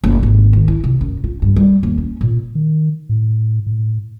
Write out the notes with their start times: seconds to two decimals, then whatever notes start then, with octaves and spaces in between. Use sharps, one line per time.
0.04 F#1
0.23 G#1
0.53 D#3
0.68 E4
0.84 C3
1.01 F#2
1.24 F4
1.42 G2
1.56 G3
1.83 D#2
1.98 C#4
2.21 A#2
2.55 D#3
3.09 A2
3.67 A2